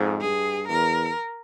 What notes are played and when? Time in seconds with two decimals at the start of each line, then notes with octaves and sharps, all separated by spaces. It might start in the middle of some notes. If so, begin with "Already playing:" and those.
Already playing: F2 G#2
0.21 G2 G#4
0.68 E2 A#4